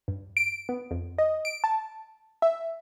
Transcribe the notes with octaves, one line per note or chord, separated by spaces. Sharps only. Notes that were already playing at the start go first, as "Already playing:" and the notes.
G2
D7
B3
F2
D#5
D7
A5
E5